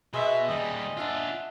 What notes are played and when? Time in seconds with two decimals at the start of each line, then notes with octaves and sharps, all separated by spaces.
0.14 B2 G#3 E5
0.48 D#2 G3 D#5
0.97 D4 F4 E5 F#5 A5